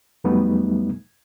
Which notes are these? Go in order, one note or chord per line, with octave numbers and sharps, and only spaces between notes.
F2 F#3 G3 A3 B3 D#4